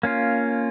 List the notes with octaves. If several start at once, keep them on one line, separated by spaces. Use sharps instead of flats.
A#3 C#4 F4